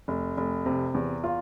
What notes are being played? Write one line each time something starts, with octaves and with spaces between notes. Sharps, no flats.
F1
F1
C3
E2
F4